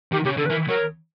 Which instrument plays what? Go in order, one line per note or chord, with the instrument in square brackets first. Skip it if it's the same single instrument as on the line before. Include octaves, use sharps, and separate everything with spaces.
[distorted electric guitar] D#3 [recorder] G4
[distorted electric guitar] C#3 [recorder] G4
[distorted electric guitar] D3 [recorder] A4
[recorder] B4
[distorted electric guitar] E3 [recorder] A#4
[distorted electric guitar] F#3 [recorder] A#4